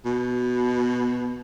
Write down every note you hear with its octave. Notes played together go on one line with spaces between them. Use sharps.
B2